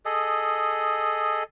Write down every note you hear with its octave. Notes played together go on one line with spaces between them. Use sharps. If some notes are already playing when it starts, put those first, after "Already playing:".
G#4 A4 D#5